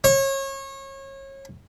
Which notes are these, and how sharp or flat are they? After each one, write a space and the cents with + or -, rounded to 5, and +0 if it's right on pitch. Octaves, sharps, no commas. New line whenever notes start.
C#5 -30